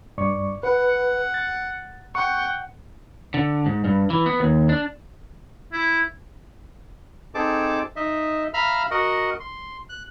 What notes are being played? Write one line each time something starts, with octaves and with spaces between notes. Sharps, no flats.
G2 D5 C#6
B4 F#5
A6
F#5 G5 C#6
D3
G#2
G2
E3
B3
D#2
D4
E4
C4 D#4 G#4 A4 A5 D6
D#4 D#5 E5
E5 F5 A#5 B5 F6
F#4 A#4 D#5 F#5
C6
F#6